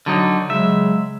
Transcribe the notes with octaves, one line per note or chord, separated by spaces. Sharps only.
D3 F#3 D#4
C#3 F#3 G#3 E5